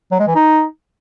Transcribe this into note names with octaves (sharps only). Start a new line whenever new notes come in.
F#3
G#3
E3
D#4